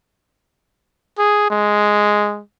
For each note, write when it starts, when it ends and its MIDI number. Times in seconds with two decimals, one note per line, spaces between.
1.18 1.48 68
1.50 2.42 56